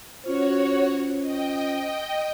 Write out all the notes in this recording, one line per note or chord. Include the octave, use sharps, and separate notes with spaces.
C#4 F4 F#4 C5 C#5
D#5 G5